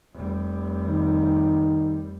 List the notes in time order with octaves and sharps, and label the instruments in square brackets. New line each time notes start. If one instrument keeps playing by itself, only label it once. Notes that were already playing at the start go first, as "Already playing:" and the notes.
[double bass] F1 G3
[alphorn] D#3